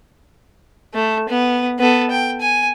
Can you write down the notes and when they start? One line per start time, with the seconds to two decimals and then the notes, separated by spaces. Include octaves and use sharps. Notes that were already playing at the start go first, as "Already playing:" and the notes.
0.94 A3
1.29 B3
1.79 B3 A4
2.11 G5
2.41 G#5